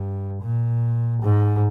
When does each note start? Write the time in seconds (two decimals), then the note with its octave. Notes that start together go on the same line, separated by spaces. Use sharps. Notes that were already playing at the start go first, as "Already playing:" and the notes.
Already playing: G2
0.42 A#2
1.22 G#2